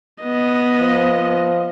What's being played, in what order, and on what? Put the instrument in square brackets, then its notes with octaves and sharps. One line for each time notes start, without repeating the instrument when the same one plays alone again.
[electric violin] B3 D#5
[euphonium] F3